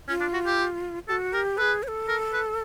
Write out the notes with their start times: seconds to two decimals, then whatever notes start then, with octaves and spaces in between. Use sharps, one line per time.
0.08 C#4 F4
0.21 D4
0.34 F#4
0.46 G4
1.08 G4 A4
1.12 F#4
1.33 G4 A#4
1.58 G#4 A4 B4
1.83 C#5
1.88 A4
2.08 A#4
2.33 B4